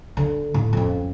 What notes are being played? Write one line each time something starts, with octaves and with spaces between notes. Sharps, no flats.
D3
A2
F2 C#4